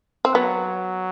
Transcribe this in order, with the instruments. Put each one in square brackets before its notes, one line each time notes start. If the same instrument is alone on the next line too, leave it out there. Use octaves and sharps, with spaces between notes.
[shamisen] C4
[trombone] F#3 [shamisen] B3